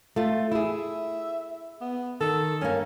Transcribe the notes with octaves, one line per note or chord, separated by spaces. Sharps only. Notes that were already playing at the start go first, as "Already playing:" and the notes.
A3 F4
E4 G#4 E5
B3
D#3 A4
G2 A#3 C#4